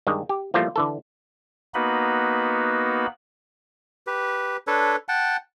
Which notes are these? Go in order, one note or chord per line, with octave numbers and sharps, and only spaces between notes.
G2 D#3 G3 G#3
G4
E3 F3 G3 A3 A#3 F4
D3 E3 A4
A#3 B3 D#4 F#4 B4 B5
G4 B4
D4 A4 B4 C#5
F#5 G5 A5